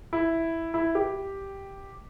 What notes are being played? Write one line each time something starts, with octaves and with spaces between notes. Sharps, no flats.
E4
E4
G4